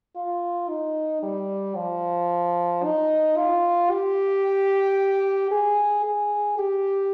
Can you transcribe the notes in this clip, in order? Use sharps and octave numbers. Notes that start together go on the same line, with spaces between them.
F4
D#4
G3
F3
D#4
F4
G4
G#4
G#4
G4